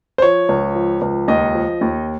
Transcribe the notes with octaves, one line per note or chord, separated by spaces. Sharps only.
C5
F3 C#5
C#2
F3
C#2
D#2 D#5
F3
D#2